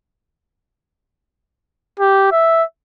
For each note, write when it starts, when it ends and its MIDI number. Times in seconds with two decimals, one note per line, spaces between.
2.00 2.28 67
2.32 2.63 76